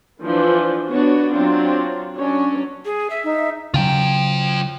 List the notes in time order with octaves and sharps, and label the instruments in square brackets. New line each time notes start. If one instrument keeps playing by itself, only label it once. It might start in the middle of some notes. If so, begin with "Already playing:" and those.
[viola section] E3 F3 D4
B3 D4 F#4 C#5
F#3 C4 D4 F4
F#3 C#4 D4 C#5
[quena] G#4
E5
[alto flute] D#4
[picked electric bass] C#3 F#3 [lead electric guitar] F4 G5